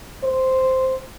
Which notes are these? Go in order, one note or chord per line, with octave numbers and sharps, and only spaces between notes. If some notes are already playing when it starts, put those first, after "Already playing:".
C5